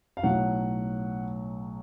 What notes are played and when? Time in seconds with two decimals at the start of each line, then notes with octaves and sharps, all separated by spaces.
0.17 F5
0.23 B1 A2 F#3 F#5